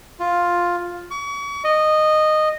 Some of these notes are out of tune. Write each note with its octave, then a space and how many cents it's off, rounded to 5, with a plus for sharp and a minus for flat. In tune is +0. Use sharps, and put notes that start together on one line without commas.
F4 +5
C#6 +40
D#5 -10